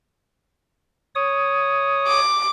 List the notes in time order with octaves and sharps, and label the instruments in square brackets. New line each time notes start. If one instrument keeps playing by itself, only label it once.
[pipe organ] C#5 D#6
[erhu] D6